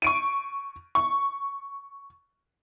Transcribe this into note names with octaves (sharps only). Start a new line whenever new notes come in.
C#6 D7 D#7
C#6